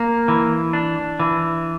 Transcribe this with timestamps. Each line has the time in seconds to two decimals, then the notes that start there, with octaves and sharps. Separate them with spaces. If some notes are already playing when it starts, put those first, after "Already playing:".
Already playing: A#3
0.28 E3
0.73 D4
1.20 E3